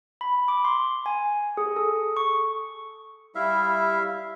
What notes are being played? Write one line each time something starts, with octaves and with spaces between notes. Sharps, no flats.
B5
D6
C6
G#5
G#4
A4
C#6
G3 E4 E5 F5